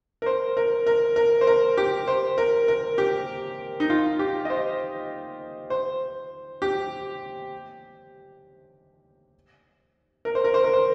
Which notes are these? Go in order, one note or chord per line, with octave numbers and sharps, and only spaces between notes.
A#4
C5
A#4
A#4
A#4
C5
A#4
G4
C5
A#4
A#4
G4
D#4
F4
G4
D#5
C5
C5
G4
A#4
C5
A#4
C5
A#4
C5